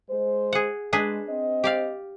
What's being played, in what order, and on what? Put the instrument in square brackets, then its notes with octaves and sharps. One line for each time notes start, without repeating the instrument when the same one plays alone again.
[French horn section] G#3 C5
[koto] G#4 F#5
[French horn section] G#3 [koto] D4 G#4 B4
[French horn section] C4 C5 D#5
[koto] G4 D5 F5